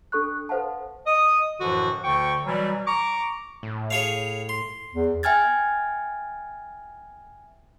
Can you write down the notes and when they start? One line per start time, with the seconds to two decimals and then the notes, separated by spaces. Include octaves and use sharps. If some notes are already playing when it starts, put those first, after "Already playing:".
0.12 D4 A4 C#6 F#6
0.49 A4 B4 C5 F5 F#5 A5
1.07 D#5 D#6
1.61 F#2 A2 D3 E3 F3 F#4
2.04 D2 D3 G5 C#6
2.46 B2 E3 F#3 G3
2.87 A#5 C#6 D6
3.63 A2
3.91 G#4 C#5 F5
4.49 C6
4.93 E2
5.23 E5 G5 G#5 F6 G#6 A6